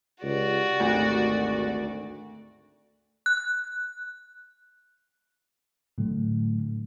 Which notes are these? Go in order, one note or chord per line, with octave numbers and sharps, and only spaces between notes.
C#2 F#4 G4 D5
G#1 D2
F#6
A2 D3 F#3 A3